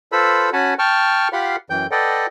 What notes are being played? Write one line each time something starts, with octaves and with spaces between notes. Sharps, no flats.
F4 A4 B4 C5 B5 E6
C#4 F#4 F#5 G#5 A5 B5
G5 A5 C#6 F6
F4 G4 F5 F#5 B5 C6
F#2 E3 G5 G6
A4 B4 D5 D#5 F#5 G5